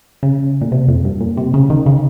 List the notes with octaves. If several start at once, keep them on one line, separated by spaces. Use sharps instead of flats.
C#3
A#2
C3
F2
G2
A#2
C3
C#3
D#3
C#3